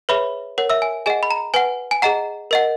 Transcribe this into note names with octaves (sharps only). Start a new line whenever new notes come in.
G#4 B4 C#5 E5 B5
A#4 C#5 F#5
E5 E6
G#5
G#4 D#5 F#5 G#5
B5
A#5
B4 F#5 G#5
G#5
G#4 D#5 F#5 A#5
A#4 D#5 F#5